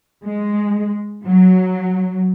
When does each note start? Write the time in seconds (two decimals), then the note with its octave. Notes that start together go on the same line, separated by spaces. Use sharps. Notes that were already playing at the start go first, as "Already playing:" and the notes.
0.24 G#3
1.25 F#3